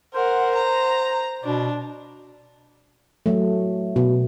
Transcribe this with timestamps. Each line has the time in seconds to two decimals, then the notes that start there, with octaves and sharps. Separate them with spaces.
0.14 A#4 C5 F#5
0.55 A#5
1.44 B2 D4
3.26 F#3 A3
3.96 B2